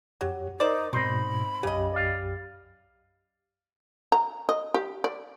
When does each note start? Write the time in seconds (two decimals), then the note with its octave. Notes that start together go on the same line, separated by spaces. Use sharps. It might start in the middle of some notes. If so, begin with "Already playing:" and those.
0.21 F2 F#3 G4 C#5
0.60 D#4 A#4 C5 D5
0.93 G#2 B2 C4 D#4 A#4 B5 C6
1.63 B1 F#2 C#3 G4 D#5
1.93 D5 F5
4.12 A#5
4.49 D#5
4.74 G4
5.04 D5